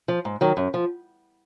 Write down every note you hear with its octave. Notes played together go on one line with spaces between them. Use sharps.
F3
G#2
D#3 F#3
F#2
F3